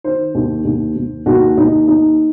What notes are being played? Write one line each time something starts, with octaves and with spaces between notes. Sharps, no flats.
D#3 C5
D#2
D#2
D#2
D#2 F#4
D#2 D#4
D#2 D#4